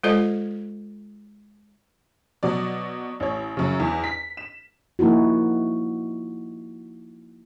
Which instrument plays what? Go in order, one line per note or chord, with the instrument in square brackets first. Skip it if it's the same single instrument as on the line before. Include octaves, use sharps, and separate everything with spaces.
[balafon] G#3 F4 A4 C5 D5 D#5
[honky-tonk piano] B2 F#3 D5
A1 C#5
F#2 C#3
E2
B6
E7
[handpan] F3 A#3 D#4 E4 F#4